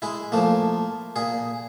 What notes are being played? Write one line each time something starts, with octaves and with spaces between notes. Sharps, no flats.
G#3 E4
F3 A3 A#3
A#2 G#4